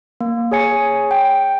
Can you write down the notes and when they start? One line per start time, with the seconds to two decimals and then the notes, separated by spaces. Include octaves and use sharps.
0.21 A#3
0.51 G#4 C#5 G#5 C#7
1.11 G5